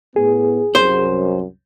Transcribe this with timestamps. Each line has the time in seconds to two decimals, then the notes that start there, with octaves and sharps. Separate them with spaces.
0.16 A2 B3 G#4
0.75 C2 F#2 C5